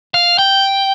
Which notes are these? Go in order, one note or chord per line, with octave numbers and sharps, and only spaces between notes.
F5
G5